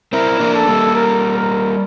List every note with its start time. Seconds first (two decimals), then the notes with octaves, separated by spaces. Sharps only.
0.13 C4 E4 A#4
0.40 A#3 D4
0.54 A4
0.67 G3 A#3
0.95 A#4
1.35 A#4